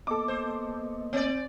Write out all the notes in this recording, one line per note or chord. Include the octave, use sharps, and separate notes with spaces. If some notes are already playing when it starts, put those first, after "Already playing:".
A#3 B3 A4 D#5 D6
C5
C4 D5